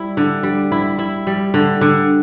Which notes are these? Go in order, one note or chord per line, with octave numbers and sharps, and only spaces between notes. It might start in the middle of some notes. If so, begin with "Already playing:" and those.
Already playing: G3 E4
D3
G3
E4
E4
G3
D3
D3